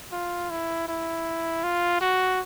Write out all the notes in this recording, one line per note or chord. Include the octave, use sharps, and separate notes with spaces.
F4
E4
E4
F4
F#4